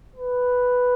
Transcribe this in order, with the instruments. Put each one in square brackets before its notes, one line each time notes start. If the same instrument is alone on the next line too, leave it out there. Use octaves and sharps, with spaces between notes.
[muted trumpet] B4